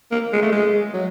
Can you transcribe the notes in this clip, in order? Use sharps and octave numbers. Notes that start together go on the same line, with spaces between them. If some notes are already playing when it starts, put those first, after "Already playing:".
A#3
G#3
A3
G#3
F#3